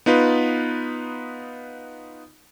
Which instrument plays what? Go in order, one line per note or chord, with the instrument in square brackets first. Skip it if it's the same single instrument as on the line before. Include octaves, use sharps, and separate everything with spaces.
[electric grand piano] B3 D#4 F4 B4